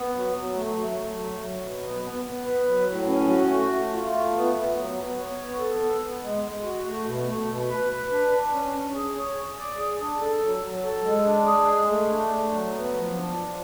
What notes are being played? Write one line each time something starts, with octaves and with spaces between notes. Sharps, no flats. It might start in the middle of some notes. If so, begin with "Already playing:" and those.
Already playing: B3
F#3
F#3
A3
F#3
A3
F#3
F#3
B2
B3
B3
B3
B4
F#3
A2
C#4
F#4
A3
A3
F4
A3
B3
B3
F#3
B3
C#5
B3
A4
B3
B3
G#3
G#3
F#4
A3
B2
A3
B2
B4
B4
D4
D4
C#4
C#4
G#4
C#5
G#4
D5
G#4
D4
A4
F#3
F#3
A4
G#3
D4
G#4
G#3
A3
D4
A3
F#3
B3
F3
D4
F3